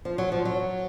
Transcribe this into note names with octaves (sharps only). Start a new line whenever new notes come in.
F3
F#3
F3
F#3